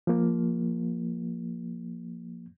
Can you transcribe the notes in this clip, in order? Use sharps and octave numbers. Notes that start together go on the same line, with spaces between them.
F3 A#3